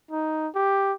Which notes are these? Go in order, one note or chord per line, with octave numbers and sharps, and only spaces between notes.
D#4
G4